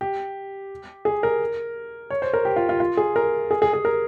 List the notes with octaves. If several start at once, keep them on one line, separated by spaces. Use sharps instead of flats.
G4
G#4
A#4
C#5
C5
A#4
G4
F4
F4
F4
G#4
A#4
G#4
G#4
G#4
A#4